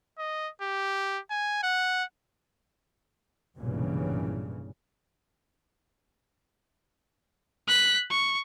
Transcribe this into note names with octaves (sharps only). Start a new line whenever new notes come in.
D#5
G4
G#5
F#5
F1 B1 G2 A#2 C#3 E3
F#6 B6
C#6